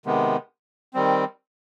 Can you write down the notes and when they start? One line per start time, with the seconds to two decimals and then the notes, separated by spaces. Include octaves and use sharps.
0.06 C3 D#3 G#3 B3
0.94 D#3 G3 C4